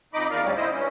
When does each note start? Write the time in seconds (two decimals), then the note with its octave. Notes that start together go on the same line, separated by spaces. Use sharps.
0.14 F2 D#4 D#5 B5 D6
0.31 E2 A#4 D5 F5
0.43 D2 G#2 G3 C#4
0.56 E4 C5 D#5
0.73 G2 C#4